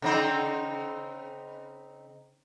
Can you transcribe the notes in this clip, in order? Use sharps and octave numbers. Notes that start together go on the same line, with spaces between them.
C#3 C4 D#4